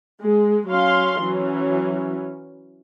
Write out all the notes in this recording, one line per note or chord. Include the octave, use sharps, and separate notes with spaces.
G#3
F#3 C#4 F5 C6
E3 F#3 C#4